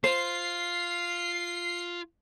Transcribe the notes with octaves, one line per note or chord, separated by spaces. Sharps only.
F4 C5 C7